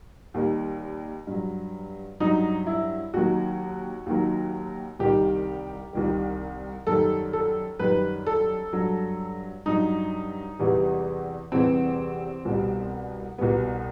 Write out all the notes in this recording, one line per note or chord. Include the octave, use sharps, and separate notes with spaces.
D#2 D#3 G3
G2 F#3
G2 F#3 D#4
E4
D#2 D#3 F#3 F#4
D#2 D#3 F#3
C2 C3 D#3 G3 G4
C2 C3 D#3 G3
F#2 D#3 G3 A4
A4
F#2 D#3 G3 B4
A4
G2 F#3
G2 F#3 D#4
E2 C3 E3 G3
E2 C3 E3 G3 C4
C2 B2 G3
C2 B2 G3 B3